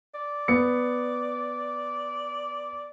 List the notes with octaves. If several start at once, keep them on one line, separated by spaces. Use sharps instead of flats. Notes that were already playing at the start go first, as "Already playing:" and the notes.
D5
B3 C#7